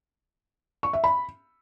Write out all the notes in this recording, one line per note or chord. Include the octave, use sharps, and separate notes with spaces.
C#6
E5
B5